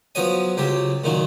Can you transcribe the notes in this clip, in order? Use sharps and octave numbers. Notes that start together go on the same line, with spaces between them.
F3 F#3 B3 C#5 G#5
C#2 F#3 G4
A#2 D#3 F#3